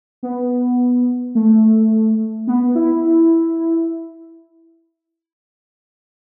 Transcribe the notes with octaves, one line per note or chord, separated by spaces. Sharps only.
B3
A3
B3
E4